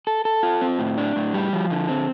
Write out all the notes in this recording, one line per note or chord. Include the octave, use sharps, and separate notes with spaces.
A4
A4
F4
C4
A2
D4
A2
G3
F3
D3
C4